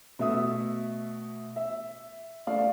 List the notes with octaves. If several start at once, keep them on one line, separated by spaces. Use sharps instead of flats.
B2 A3 E5 D#6
E5
A3 D5 F5